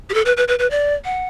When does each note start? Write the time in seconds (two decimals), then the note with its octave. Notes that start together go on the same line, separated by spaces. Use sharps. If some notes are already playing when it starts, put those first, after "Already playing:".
0.10 G4
0.14 A4
0.26 B4
0.37 B4
0.48 B4
0.59 B4
0.71 D5
1.05 F#5